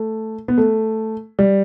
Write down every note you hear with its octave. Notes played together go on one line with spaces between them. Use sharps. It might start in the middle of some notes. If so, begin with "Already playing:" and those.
Already playing: A3
B3
A3
G3